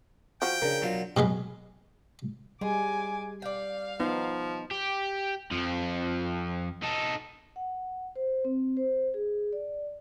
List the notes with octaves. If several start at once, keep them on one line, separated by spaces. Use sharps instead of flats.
F3 F#4 G5
C#3 D4 A#4
B2 F#3 F4
B2 F#3 G#3 B3
G3 G#3 G#5 D6
D5 F5 G5
F3 B3 D#4
G4
F2 F3
D#4 A4
F#5
C5
C4
C5
G#4
D5